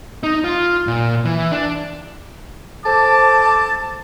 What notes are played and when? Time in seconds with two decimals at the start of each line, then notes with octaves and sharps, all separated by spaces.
0.23 D#4
0.44 F4
0.87 A#2
1.25 E3
1.52 D4
2.86 A4 C5 A5 D6